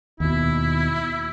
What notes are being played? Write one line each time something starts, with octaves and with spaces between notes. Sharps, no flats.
D#2 B2 E4